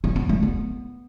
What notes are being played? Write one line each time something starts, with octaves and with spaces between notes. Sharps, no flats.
C4
B3
A3
B3